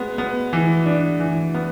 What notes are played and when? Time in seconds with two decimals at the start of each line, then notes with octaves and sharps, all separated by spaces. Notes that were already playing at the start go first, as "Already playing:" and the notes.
Already playing: G#3 B3
0.18 B3
0.53 E3
0.86 D4
1.20 E3
1.54 B3